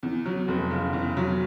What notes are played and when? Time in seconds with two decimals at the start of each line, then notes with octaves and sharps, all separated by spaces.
0.03 E2
0.26 F#3
0.48 F1
0.71 C#3
0.93 E2
1.17 F#3